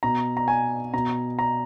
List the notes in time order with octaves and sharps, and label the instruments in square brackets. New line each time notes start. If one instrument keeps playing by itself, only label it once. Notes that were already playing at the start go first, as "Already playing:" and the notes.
[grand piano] B2 A#5
A#5
G#5
B2 A#5
A#5